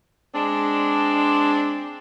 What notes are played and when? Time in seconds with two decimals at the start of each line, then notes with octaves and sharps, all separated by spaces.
0.34 G#3 C4 D4